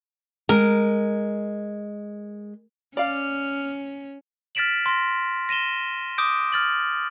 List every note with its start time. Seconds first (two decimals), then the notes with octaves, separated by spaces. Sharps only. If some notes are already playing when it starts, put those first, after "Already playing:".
0.49 G#3 A#4
2.97 C#4 D5 F5 F6
4.55 F6 A6 B6 D7 E7 F#7
4.86 C6 A#6
5.49 A#6 D#7 E7 G7
6.18 D6 D#6 G6 D7
6.52 F6 A6 F#7